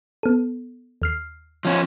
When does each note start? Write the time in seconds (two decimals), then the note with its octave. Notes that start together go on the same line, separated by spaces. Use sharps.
0.23 B3 A4
1.02 D#2 F6 C7
1.65 F3 C#4